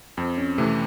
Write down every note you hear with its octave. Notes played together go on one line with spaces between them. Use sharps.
F2 C4
C#4
C3 E3 A3